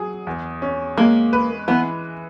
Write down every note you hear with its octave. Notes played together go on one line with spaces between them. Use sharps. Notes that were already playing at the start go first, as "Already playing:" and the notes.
Already playing: F#3 G#4
E2
C#4
G#3 A#3
B4
E3 B3